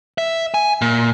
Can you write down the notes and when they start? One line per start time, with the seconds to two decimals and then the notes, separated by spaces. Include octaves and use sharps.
0.18 E5
0.54 G#5
0.82 A#2